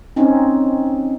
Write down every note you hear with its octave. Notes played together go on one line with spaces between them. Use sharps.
C4 C#4 D#4